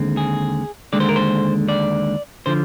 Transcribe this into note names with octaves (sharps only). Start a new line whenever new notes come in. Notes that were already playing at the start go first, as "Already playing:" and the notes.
Already playing: D#2 D3 G#3 C4
G#4
D#2 D3 G#3 D5
C5
A#4
C5
D5
D3 F3 C5